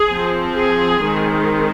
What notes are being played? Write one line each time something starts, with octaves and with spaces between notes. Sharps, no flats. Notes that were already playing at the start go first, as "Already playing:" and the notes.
Already playing: G#4
F3 C4
G#4
D#3 G#3 C4